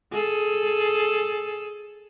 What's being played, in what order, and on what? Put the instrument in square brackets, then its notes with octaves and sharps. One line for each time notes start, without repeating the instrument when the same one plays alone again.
[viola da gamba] G#4 A4